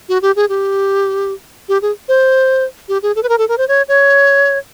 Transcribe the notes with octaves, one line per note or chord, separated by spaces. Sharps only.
F#4
G4
G#4
G4
G4
G#4
C5
G4
G#4
A4
B4
A#4
A4
A#4
C5
C#5
C#5